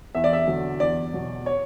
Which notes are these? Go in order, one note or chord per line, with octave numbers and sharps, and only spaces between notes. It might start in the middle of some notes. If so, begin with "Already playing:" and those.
E2 E5
D5
E5
D3 F#3
E2 D5
B2 F#3
C#5